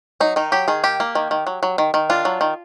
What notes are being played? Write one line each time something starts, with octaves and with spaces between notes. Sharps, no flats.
F#3 D#4
D#3 D#4
F#3 G4
D#3 G#4
A#3 G4
A#3
D#3
D#3
F#3
F#3
D#3
D#3
D4 F4
F#3
D#3